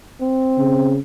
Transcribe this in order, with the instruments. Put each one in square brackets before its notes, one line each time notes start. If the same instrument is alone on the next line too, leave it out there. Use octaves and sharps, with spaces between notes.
[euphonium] C4
[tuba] C#3